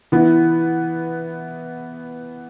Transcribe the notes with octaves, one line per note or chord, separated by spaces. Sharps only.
E3 B3 E4